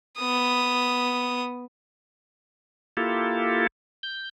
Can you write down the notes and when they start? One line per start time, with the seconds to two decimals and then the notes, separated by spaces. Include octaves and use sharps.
0.18 B3 D#6
2.97 A#3 E4 F4 G4 A4
4.03 G6